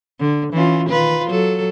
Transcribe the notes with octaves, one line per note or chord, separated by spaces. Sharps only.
D3
E3 C#4 F4
D#3 F4 B4
F#3 A4